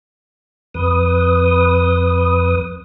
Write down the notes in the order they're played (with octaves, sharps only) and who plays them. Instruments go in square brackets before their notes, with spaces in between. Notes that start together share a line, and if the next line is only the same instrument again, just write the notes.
[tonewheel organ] F2 B4 D#6